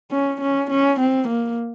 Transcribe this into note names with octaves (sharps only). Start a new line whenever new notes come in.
C#4
C#4
C#4
C4
A#3